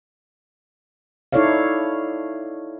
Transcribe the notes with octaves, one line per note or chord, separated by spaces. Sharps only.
D#4 E4 A4 C#5 D5 F5